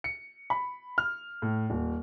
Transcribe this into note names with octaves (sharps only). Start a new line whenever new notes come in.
C#7
B5
F6
A2
D#1